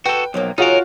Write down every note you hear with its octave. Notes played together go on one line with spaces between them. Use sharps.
F#4 A4 B4 G5
B1 F3 F#3 A#3
C#3 F#3 D#4 F4 F#4 A#4